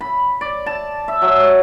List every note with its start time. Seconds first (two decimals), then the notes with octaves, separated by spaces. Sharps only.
0.01 B5
0.41 D5
0.66 A5
1.08 E5
1.22 F#3